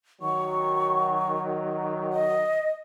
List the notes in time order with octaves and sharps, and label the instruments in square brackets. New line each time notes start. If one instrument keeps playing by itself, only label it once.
[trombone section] D#3 F#3 [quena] C#6
[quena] D#5